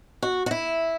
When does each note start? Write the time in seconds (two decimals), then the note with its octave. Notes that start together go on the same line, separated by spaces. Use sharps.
0.23 F#4
0.46 F#4
0.51 E4